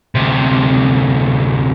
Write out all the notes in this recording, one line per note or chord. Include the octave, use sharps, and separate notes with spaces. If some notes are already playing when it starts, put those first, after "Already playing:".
D2 C3